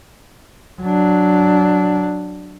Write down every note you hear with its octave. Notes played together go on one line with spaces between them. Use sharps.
F#3 D4